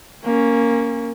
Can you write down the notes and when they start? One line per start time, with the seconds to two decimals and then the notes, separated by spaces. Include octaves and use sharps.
0.24 A#3 C#4